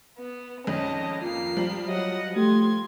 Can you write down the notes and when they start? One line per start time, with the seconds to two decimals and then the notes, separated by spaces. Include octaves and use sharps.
0.18 B3
0.67 G#1 F2 C#4 D#5 A5
1.22 A#3 F4 C7
1.57 F3 G3
1.87 F#3 D#5 F#5
2.36 A3 G4 C6 G#6